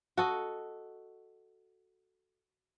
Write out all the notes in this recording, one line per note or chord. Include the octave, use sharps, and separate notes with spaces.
F#4 A4 D#5